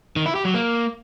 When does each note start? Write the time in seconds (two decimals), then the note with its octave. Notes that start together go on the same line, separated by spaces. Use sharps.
0.16 D#3
0.26 E4
0.35 G4
0.45 F#3
0.54 A#3